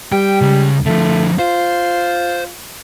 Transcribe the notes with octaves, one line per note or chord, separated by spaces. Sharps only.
G3 G5
C#2 C#3
D3 F3 A3
F4 C5